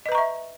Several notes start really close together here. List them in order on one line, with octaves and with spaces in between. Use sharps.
D#5 B4 A#5 C#6 E5